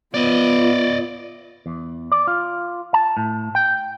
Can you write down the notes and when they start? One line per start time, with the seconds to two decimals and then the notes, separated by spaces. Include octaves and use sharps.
0.14 B3 F4 D5 D#5
1.66 E2
2.12 D5
2.27 F4
2.94 A5
3.17 A2
3.55 G5